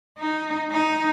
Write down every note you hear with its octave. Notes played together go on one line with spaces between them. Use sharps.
D#4
D#4